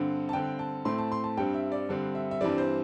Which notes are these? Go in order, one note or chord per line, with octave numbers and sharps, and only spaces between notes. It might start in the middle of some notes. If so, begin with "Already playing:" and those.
Already playing: G2 D3 C4
A5
G2 D3 C4 G5
A5
A2 A3 C4 C6
A5
C6
A5
G2 G3 C4 G5
E5
D5
G2 D3 G3 C4
E5
E5
G2 E3 G3 C4 D5
C5